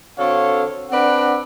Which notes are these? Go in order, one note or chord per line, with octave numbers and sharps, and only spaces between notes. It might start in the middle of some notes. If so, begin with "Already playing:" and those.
D3 C4 F#4 A4 C#5 F5
C4 D4 B4 D5 F#5